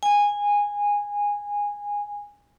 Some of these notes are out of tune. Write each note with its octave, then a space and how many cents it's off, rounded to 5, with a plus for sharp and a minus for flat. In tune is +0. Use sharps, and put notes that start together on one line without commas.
G#5 -15